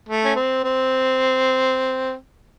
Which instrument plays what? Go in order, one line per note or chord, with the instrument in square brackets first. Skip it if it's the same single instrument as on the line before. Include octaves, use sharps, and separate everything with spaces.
[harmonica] A3
C#4
C4
C4